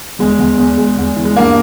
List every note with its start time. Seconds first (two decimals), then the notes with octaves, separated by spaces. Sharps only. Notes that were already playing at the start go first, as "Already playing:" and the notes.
0.19 E2 G#3
0.39 E2
0.58 E2
0.78 G#3
0.97 E2
1.16 E3
1.25 G#3
1.36 G2 A#3